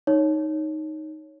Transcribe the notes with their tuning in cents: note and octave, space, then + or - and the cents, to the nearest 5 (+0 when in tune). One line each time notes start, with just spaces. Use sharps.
D#4 +0 C#5 +0